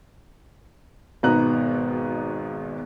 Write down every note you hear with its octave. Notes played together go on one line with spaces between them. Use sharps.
G#1 G#2 B2 B3 A#5 F#6